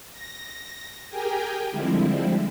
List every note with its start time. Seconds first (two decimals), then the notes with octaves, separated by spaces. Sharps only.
0.12 A#6
1.09 G4 G#4 A#4 G5 G#5
1.71 D3 F3 G3 G#3 C4 E4